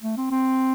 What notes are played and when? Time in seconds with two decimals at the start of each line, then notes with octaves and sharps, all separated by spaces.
0.02 A3
0.17 C4
0.31 C4